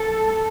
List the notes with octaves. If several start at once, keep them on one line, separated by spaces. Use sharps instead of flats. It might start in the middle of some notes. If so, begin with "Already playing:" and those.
Already playing: A4